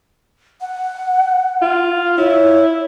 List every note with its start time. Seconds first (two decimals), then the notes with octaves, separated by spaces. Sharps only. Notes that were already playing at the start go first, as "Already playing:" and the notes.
0.61 F#5
1.62 F4
2.18 E4 C#5